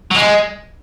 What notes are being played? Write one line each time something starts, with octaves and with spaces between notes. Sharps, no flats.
F#3
G#3